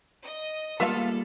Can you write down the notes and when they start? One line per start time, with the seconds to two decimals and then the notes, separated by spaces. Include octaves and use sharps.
0.23 D#5
0.80 G3 G#3 A#3 B3 F4 A4 E5 F5